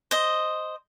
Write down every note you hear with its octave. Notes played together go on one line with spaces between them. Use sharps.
C5 D#5